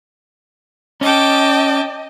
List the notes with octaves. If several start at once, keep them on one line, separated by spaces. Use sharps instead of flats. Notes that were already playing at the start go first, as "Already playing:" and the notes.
C#4 D#5 G5 A5 D6